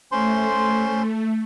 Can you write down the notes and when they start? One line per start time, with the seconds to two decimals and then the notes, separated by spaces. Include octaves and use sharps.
0.12 A3 C#4 C5 C6